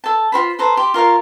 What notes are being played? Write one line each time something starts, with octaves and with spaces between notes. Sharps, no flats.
A4 A5
F4 F#4 C5 B5
A4 B4 C5 A#5
G4 C6
F4 A#4 C#5 F5